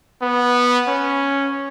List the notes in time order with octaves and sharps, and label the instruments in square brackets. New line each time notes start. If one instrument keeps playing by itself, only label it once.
[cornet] B3
C#4